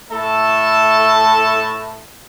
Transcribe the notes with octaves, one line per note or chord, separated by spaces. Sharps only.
A2 A3 A4 E5 A5